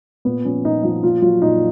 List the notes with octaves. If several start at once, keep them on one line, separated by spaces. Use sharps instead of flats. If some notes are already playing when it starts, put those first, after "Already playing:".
A#2 B3
F3 C#4
A#2 D#4
F3 D#4
A#2 F4
F#3 F4
A#2 D#4